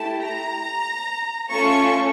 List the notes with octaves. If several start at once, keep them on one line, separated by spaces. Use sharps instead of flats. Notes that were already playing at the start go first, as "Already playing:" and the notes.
Already playing: A3 E4 G4 A5
A#5
A3 C#4 F4 A4 C#6